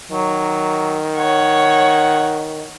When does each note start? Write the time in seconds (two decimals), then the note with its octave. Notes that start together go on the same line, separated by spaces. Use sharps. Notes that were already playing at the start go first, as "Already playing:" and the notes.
0.12 D#3 F#3
1.17 C#5 F#5